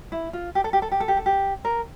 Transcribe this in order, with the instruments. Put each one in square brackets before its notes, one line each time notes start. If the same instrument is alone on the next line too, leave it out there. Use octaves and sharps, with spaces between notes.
[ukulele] E4
F4
G4
A4
G4
A4
G4
A4
G4
A4
G4
A#4